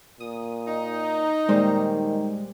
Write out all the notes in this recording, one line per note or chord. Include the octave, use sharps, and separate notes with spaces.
A#2 D#6
D#4
A#2 D#3 G3 G#3 C5